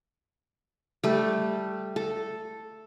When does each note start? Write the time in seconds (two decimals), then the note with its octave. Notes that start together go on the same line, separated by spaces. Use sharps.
1.03 G3 A3
1.96 A4